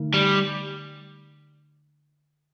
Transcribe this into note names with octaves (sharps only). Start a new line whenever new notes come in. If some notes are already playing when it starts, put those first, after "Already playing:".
Already playing: D3 A3 D#4
G3